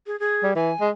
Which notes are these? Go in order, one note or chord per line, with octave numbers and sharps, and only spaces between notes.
G#4
G#4
G3
E3 G#5
G#3